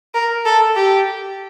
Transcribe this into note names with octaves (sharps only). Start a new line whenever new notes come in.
A#4
A4
G4